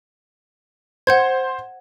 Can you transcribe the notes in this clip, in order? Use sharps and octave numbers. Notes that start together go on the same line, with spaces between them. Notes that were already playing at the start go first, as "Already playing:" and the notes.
C5 F#5 G6 G#6